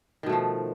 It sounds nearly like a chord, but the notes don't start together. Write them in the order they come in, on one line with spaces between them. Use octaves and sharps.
D#3 B2 A3 F3